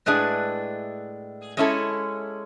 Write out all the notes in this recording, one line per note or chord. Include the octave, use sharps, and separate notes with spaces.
A2 G#3 D4 G#4 B4
G#3 C#4 E4 A4